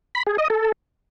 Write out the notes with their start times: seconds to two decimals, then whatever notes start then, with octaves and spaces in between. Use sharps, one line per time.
0.15 B5
0.27 G#4
0.38 D#5
0.50 A4